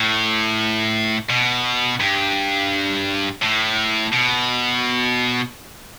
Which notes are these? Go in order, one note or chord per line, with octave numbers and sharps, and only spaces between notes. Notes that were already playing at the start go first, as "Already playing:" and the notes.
Already playing: A2
B2
G2
A2
B2